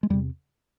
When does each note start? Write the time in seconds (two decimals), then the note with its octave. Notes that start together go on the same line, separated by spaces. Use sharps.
0.03 G#3
0.10 E2 G3
0.14 C3